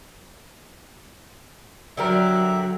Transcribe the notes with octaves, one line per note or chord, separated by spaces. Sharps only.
D3 F#3 G4 A#4 E5